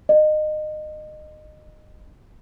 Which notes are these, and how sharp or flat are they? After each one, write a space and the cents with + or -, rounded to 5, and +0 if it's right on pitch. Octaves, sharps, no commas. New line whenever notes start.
D#5 -25